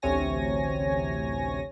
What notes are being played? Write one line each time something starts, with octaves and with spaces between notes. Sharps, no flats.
A1 D2 C3 C#5 G#5 A#6